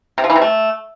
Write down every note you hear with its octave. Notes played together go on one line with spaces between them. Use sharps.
C3
F3
E3
C3
A3